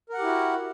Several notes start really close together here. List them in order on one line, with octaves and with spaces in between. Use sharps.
A#4 F#5 G4 E4 F#4